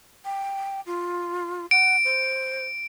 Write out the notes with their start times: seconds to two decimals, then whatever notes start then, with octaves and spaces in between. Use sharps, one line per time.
0.25 G5
0.86 F4
1.71 F#5 D7
2.05 C5